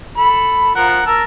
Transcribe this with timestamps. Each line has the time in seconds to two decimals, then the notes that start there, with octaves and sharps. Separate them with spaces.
0.17 A4 B5
0.75 F3 A#4 F#5
1.06 A#4 A5 E6